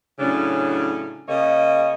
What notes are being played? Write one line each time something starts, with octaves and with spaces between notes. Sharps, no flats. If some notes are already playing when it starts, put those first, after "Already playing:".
A2 C#3 F#3 C#4 D4
C#3 A#3 C#5 D#5